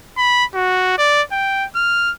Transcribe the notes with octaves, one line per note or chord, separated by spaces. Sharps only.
B5
F#4
D5
G5
F6